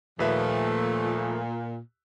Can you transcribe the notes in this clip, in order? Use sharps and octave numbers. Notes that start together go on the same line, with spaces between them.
D#2 A#2 F3 A3 B4 E5